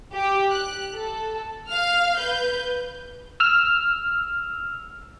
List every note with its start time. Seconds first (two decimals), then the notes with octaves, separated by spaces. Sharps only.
0.14 G4
0.51 F#6
0.95 A4
1.69 F5 F6
2.18 B4 G6
3.40 E6 F6